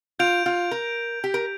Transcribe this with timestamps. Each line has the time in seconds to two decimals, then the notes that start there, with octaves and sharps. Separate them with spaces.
0.19 F4 G6 D7 F7
0.46 F4
0.71 A#4
1.24 G4
1.34 A#4